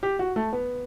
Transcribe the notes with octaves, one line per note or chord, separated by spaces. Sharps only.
G4
F#4
A3
B3